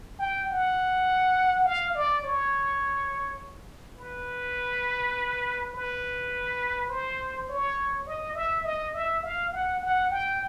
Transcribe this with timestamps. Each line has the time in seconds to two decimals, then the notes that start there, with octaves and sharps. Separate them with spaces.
0.19 G5
0.49 F#5
1.65 F5
1.94 D5
2.24 C#5
3.98 B4
5.73 B4
6.89 C5
7.49 C#5
8.07 D#5
8.35 E5
8.64 D#5
8.94 E5
9.23 F5
9.53 F#5
9.82 F#5
10.11 G5